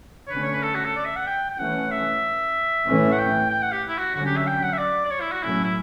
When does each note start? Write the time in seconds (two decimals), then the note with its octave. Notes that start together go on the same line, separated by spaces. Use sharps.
0.27 C#5
0.31 D3 A3 C#4 B4
0.42 C#5
0.53 B4
0.63 A4
0.74 F#4
0.84 A4
0.96 D5
1.05 E5
1.16 F#5
1.27 G5
1.50 G5
1.59 E3 A3 C#4 F#5
1.91 E5
2.87 A2 E3 A3 C#4
3.12 F#5
3.18 G5
3.50 G5
3.62 F#5
3.72 G4
3.88 E4
3.98 F#4
4.15 D3 F#3 C#4 F#4
4.26 G4
4.37 E5
4.47 G5
4.63 F#5
4.73 E5
4.78 D5
5.05 D5
5.11 C#5
5.21 E4
5.32 F#4
5.42 A2 F#3 A3 C#4 E4
5.64 E4